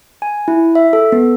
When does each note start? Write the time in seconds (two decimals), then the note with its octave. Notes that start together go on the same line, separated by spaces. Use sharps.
0.22 G#5
0.48 E4
0.75 E5
0.93 A4
1.12 B3